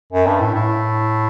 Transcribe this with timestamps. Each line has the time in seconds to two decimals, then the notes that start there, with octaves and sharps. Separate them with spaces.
0.13 F#2
0.27 G2
0.40 A2
0.54 A2